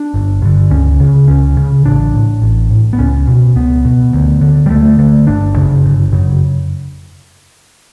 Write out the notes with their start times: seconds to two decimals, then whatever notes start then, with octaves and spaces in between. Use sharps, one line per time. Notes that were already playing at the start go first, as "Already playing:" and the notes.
Already playing: D4
0.14 G1
0.42 G2 D3
0.71 C#2 C#4
1.00 C#3
1.28 C#2 C#4
1.57 C#3
1.85 A1 D4
2.14 A2
2.42 A1
2.70 A2
2.93 B3
2.99 C#2 C#4
3.27 B2
3.56 C#2 B3
3.85 B2
4.13 D2
4.41 D3
4.66 G3
4.70 D2 A3
4.98 D3 A3
5.27 G1 D4
5.56 F#2 C#3
5.84 G1
6.12 F#2 C#3